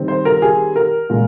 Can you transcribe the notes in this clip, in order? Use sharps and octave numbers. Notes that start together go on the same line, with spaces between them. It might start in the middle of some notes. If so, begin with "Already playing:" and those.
Already playing: D#3 G3 C4
C5
A#4
G#4
A#4
A#2 G#3